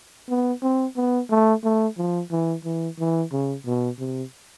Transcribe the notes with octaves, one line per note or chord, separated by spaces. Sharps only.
B3
C4
B3
A3
A3
F3
E3
E3
E3
C#3
B2
C3